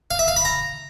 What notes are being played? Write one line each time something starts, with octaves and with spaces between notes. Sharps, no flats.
F5
E5
F5
B5
A#5